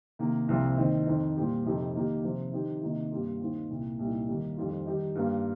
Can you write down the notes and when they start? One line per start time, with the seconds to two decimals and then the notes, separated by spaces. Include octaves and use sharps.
0.19 C3 D#3 A#3 D#4
0.48 C2 C3 F3 C4 F4
0.77 D#2 D#3 C4 D#4
1.06 F2 D#3 C4
1.37 A#2 G3 C4 G4
1.65 F2 C3 F3 D#4 G4
1.95 D#3 A#3 D#4 G4
2.23 C3 F3 C4
2.52 D#3 C4 D#4 G4
2.82 C3 D#3 A#3 D#4
3.12 G2 G3 A#3 F4
3.40 D#2 D#3 C4 F4
3.70 C2 A#2 A#3
3.99 C2 A#2 G3 D#4
4.28 D#2 D#3 G3 A#3 D#4
4.57 F2 D#3 G3 C4 F4
4.86 D#3 G3 D#4 G4
5.15 G2 G3 A#3 F4